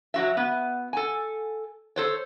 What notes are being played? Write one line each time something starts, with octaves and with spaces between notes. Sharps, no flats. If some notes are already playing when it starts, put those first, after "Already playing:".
F#3 F#4 E5
B3
A4 G#5
A4 C5 C#5